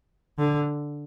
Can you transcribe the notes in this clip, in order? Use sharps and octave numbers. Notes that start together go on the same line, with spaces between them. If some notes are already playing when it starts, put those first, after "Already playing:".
D3